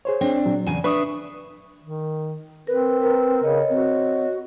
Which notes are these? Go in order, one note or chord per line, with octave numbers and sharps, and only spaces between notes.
G#4 C5 C#5
C4 D4 D5
A#2 F#3
E2 C#3 G#5
D4 B4 E5 C#6 D#6
D#3
C4 A#4 B4
A#4 B4
C#3 C#5 D#5
C4 F#4